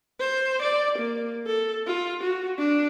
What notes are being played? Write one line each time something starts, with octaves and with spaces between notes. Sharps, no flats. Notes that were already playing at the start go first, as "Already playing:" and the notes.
C5
D5
A#3
A4
F4
F#4
D4